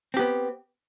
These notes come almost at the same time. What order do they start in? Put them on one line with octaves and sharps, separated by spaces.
C4 G4 B3